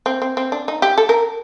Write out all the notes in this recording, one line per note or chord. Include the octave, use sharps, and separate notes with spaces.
C4
C4
C4
D4
D#4
G4
A4
A#4